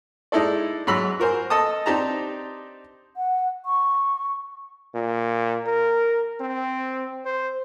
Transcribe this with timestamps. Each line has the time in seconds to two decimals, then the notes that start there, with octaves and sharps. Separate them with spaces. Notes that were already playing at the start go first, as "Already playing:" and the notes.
0.32 G#3 D#4 E4 A4 D5
0.87 G#2 F#3 B5 E6
1.20 F#4 A#4 C5 G#5
1.50 A4 D#5 A5 D#6
1.86 C4 D4 D#4 G4 A5 A#5
3.17 F#5
3.66 C#6
4.94 A#2
5.66 A#4
6.40 C4
7.25 C5